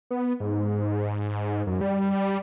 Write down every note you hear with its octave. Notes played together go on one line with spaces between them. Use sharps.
B3
G#2
F#2
G3